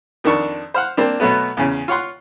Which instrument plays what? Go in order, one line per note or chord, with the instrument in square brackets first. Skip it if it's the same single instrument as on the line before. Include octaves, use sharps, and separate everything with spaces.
[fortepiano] F2 D#3 D4 C#6
C5 F5 F#5
A#3 C4 D4
B2 F#3 A3 B3
E2 C#3
F4 C#5 F#5 C6